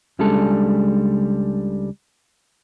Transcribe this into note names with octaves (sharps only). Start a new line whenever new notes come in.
C#2 C#3 G3 G#3 D4 A4